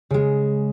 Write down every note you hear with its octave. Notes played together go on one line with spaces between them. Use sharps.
C#3 G#3